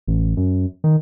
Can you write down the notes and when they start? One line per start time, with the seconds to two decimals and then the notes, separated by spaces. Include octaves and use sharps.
0.07 A1
0.37 F#2
0.84 D#3